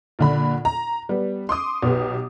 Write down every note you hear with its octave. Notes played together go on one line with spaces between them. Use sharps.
A#1 D3 B5
A#5
G3 B3
C6 D6 D#6
B1 B3 G4